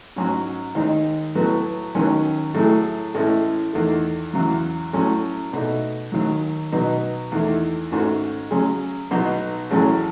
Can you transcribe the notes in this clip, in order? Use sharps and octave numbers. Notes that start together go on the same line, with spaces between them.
G#2 F#3 C#4 F#4
D#2 D#3 G#3 D#4
A2 F#3 B3 F#4
D#2 D#3 F#3 C#4
A2 F#3 A3 E4 G#4
A2 E3 G#3 C#4 E4
E2 D#3 A3
E2 C#3 F#3
A2 F#3 C#4 F#4
B2 A3 D#4
D#2 D#3 F#3
B2 F#3 B3 D#4
E2 D#3 A3 E4
G#2 D#3 A3 C#4 F#4
C#3 F#3 C#4 G#4
B1 B2 F#3 B3 D#4
A1 A2 F#3 C#4 G#4